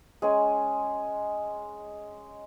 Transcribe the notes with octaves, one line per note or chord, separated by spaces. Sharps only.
G#3 C#4 G#5